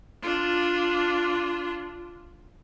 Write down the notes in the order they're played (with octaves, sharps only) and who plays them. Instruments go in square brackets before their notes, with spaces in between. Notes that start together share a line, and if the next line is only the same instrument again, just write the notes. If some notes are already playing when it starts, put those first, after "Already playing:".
[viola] D4 F4